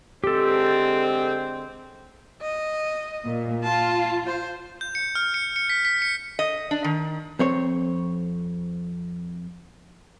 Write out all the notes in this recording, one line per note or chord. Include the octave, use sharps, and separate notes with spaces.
D3 G#3 C4 G4 A4
D#5
A#2
F4 A5
C5
G6
C#7
F6
C#7
C#7
B6
B6
C#7
D#5
D4
D#3
F2 C4 C#5